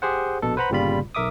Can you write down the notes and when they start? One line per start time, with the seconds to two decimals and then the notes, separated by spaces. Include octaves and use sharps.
0.02 G4 G#4 C5 F#5
0.42 A#1 B2 A4
0.57 B4 C5 F#5 A#5 B5
0.70 G1 A#2 C#3 G3 F4 B5
1.15 B1 A#4 E5 D6 D#6